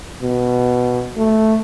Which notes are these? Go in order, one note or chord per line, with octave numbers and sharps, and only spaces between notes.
B2
A3